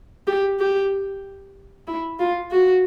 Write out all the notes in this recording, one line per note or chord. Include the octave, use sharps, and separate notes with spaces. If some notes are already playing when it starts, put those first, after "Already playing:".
G4
G4
E4
F4
F#4